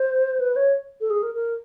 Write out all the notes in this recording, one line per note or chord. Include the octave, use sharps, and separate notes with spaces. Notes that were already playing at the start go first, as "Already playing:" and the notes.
Already playing: C5
B4
C#5
A4
G#4
A#4
A#4